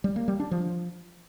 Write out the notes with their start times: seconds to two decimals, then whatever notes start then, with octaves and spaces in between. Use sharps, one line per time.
0.04 G3
0.16 A#3
0.28 G3
0.40 D4
0.51 F3